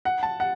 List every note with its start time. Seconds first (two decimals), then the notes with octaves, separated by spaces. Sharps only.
0.05 F#5
0.23 A5
0.40 F#5